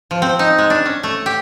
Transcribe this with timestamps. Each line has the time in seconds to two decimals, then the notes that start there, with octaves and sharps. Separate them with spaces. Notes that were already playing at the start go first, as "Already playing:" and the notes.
0.11 F3
0.22 C4
0.39 D#4
0.58 G#3
0.70 D4
0.86 C#4
1.03 A3
1.26 G4